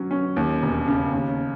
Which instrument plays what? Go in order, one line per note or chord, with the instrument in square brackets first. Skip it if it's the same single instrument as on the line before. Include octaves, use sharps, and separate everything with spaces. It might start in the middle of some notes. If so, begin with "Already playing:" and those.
Already playing: [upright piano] F#3 C#4
C#4
D#2
E1
C#3
D#2